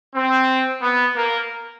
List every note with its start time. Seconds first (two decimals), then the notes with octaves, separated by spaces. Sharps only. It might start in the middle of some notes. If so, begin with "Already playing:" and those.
0.15 C4
0.82 B3
1.16 A#3